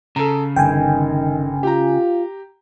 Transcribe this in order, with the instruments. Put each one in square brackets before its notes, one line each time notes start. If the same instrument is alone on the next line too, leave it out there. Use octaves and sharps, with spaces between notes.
[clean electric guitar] C#3 [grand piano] A4 A#5
[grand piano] G1 [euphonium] D#3 [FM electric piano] G5 G#5
[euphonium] F4 [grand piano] G4 A#5